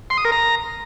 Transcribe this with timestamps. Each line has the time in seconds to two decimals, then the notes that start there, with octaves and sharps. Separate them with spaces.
0.10 C6
0.17 D#6
0.25 A#4
0.32 A#5